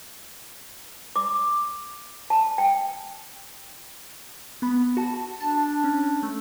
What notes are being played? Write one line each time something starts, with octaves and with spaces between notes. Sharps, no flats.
D6
A5
G5
B3 B5
F#4 A5
D4 A5
C#4
A3